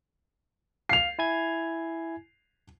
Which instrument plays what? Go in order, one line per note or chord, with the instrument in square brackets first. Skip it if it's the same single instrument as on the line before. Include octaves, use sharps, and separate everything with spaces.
[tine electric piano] F5 [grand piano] C7 F7
[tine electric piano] E4 G#5 G#6